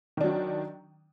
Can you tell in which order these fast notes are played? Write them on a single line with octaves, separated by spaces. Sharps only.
D#3 D4 F#3